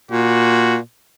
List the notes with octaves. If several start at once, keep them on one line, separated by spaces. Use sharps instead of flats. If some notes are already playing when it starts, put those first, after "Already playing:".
A#2 F#4